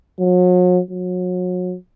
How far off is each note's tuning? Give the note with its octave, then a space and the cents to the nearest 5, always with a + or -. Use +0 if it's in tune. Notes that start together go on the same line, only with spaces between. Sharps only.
F#3 -40
F#3 -35